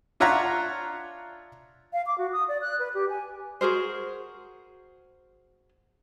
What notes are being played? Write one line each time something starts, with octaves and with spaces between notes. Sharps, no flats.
D4 F4 C#5 E5 F#5 A#5
F5
D6
F#4
D#6
D5
F#6
B4
G4
G#5
F#4 G#4 A#4 C5